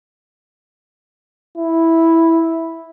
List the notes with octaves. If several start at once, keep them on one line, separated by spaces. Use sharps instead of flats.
E4